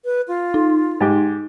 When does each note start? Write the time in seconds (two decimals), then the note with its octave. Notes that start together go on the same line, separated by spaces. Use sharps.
0.05 B4
0.28 F4
0.54 D#4
1.01 G#2 G4